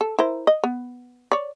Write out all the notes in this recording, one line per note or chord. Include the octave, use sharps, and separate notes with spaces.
A4
E4 A#4 C5
D#5
B3
C#5 D5